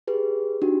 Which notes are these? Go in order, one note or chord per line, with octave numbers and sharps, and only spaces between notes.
G4 G#4 B4
D4 D#4 F#4 G4